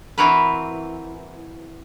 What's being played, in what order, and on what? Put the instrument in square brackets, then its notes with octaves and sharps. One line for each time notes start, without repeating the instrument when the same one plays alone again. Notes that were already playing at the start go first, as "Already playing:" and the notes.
[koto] E3 C4 E4 F#4 A#4 B4